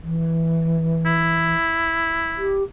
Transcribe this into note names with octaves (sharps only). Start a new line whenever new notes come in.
E3
E4
G4